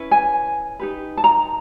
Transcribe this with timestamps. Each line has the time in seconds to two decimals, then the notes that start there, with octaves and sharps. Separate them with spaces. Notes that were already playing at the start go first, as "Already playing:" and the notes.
Already playing: C#4 E4 B4
0.11 G#5
0.80 D#4 G4 B4
1.17 A5
1.24 A#5